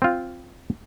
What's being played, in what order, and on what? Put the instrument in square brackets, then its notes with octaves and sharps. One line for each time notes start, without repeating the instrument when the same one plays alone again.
[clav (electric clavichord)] C4 F4